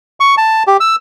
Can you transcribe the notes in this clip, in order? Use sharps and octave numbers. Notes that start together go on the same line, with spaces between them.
C#6
A5
G4
E6